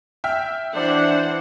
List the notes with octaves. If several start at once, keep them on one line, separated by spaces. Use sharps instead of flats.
E5 G5 F6
E3 D4 C5 F#5